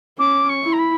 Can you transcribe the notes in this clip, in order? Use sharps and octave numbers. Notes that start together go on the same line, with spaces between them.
C#4 D6
C#6
E4
A#5
B5